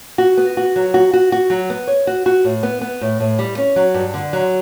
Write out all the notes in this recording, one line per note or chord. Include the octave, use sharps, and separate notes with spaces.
F#4
B3
F#4
F#3
F#4
F#4
F#4
F#3
B3
C#5
F#4
F#4
A2
B3
B3
A2
A2
G3
C#4
F#3
G2
D3
F#3